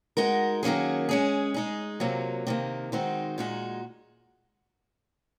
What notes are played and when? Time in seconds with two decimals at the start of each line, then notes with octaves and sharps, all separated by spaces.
0.17 G#3 D#4 F#4 A#4
0.63 D#3 F#3 A#3 C#4 G#4
1.09 G#3 C#4 G#4
1.54 G#3 D#4 G#4
2.00 C3 F#3 A#3 F4
2.47 C3 D#3 A#3
2.92 D#3 G#3 C4 D#4 F#4
3.38 A#2 G#3 D#4 F#4